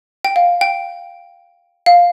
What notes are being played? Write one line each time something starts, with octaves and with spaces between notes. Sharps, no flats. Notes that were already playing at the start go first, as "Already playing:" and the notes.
G5
F5
G5
F5